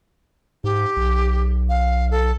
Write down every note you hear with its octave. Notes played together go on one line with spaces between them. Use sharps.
G#2 G4
B1
F5
A4